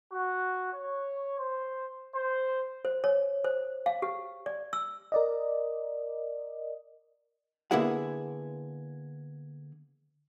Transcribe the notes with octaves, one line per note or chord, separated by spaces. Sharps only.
F#4
C#5
C5
C5
C5
C#5
C5
F5
G4
D5
E6
A#4 D5 D#5
D3 A#3 B3 E4 G#4 F#5